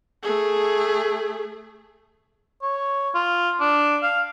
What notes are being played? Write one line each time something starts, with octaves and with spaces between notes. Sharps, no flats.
A3 G#4
C#5
F4
D4
F5